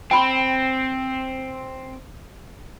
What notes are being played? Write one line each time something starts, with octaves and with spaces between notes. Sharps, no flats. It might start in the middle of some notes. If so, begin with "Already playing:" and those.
C4 G5 B5 C6